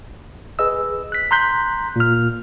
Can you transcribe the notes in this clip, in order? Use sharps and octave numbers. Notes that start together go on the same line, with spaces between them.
G#4 B4 D#5 E6
F#6 B6
A#5 C6 F#6 G6 B6
A#2 F6